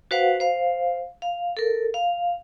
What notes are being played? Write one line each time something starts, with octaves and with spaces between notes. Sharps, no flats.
F#4 B4 C5 F5 F#5
C5 F5
F5
A4 A#4
F5